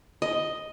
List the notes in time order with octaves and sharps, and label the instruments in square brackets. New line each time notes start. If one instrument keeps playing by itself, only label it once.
[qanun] D#5